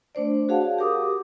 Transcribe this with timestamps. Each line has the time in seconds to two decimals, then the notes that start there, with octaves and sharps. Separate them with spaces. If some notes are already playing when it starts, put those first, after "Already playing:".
0.15 A3 D4 C5 D5
0.49 F#4 G#4 C#5 F5 F#5 A5
0.78 G4 A#4 D6 D#6